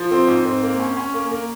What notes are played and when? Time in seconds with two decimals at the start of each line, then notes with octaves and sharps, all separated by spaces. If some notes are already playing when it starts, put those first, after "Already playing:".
Already playing: F3
0.11 C4
0.28 G#2
0.45 C4
0.63 A#3
0.80 C#4
0.97 C#4
1.14 A#3
1.31 A#3